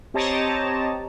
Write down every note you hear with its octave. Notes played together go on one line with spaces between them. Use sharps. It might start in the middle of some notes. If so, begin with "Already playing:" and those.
C4 G4 C#5 D#5 A5 A#5